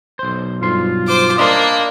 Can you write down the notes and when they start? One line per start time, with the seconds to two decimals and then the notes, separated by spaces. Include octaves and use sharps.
0.19 B1 C5
0.62 B1 G2 F4 C6
1.07 C5 D6
1.38 A#3 D4 D#5 B5 C6